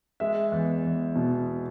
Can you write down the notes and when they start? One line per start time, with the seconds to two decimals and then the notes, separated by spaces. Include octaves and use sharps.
0.20 G#3 E5
0.52 E2
0.84 E2
1.16 B2